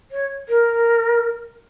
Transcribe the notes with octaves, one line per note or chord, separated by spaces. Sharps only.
C#5
A#4